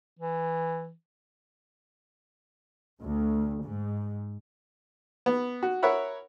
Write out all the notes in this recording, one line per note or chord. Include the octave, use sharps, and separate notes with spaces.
E3
D2
G#2
B3
F#4
A#4 C#5 E5 F#5 B5